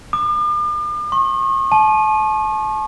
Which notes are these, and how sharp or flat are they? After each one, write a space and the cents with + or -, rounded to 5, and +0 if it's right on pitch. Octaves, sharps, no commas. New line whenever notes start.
D6 +45
C#6 -40
A5 -35